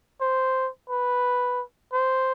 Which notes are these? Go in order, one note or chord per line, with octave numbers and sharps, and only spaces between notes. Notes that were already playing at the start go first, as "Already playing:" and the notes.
C5
B4
C5